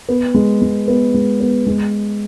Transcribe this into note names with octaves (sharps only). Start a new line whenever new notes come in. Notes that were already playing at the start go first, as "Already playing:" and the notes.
B3
G#3
G#3
B3
G#3
B3
G#3